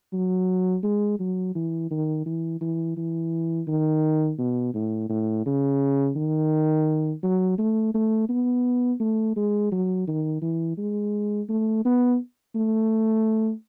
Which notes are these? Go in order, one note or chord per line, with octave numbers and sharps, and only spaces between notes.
F#3
G#3
F#3
E3
D#3
E3
E3
E3
D#3
B2
A2
A2
C#3
D#3
F#3
A3
A3
B3
A3
G#3
F#3
D#3
E3
G#3
A3
B3
A3